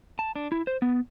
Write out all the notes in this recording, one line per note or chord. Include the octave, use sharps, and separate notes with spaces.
A5
D4
E4
C5
B3